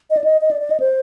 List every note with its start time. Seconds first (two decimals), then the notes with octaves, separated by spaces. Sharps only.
0.10 D#5
0.17 D5
0.24 D#5
0.41 D#5
0.51 D5
0.61 D5
0.70 D#5
0.80 C5